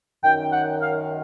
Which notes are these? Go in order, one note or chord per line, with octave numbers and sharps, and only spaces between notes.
F#2 D#3 G5
F#5
F5